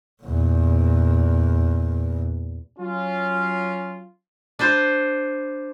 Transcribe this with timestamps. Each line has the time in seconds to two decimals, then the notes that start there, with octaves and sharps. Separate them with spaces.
0.23 E2 A#2
2.79 F#3 C#4 F4
4.59 D4 B4 C5